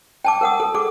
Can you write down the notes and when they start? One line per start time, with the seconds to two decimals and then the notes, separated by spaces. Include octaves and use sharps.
0.25 G5 A5 D6
0.41 A#4 F#5 D#6
0.60 A4
0.74 G#4 A4 D6